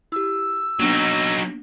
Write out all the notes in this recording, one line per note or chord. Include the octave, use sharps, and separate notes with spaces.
E4 G4 E6
F#3 A#3 B3 D4 D#4